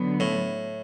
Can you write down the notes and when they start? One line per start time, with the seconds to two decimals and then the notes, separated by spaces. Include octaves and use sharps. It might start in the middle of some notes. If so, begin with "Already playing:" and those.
Already playing: D3 F#3 B3
0.20 A2